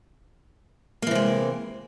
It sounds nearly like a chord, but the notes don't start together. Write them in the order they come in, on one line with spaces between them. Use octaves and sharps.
A#3 E3 C3 G#3